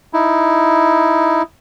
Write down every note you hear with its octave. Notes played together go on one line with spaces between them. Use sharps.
D#4 E4